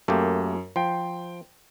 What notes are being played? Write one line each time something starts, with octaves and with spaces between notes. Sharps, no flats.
F#2 A3 A#3 G4
F3 G5 C6